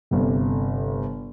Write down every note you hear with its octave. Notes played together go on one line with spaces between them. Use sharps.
G1 C3